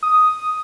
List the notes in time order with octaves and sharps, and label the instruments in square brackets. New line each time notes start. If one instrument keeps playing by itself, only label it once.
[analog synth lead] D#6